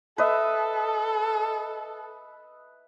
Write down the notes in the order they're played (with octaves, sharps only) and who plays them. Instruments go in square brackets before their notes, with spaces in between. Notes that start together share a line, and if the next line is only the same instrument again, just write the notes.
[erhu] A4 [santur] B4 D#5 E5